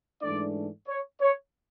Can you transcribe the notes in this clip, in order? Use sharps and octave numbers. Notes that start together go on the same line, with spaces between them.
G#2 E3 A3 D4 D5
C#5
C#5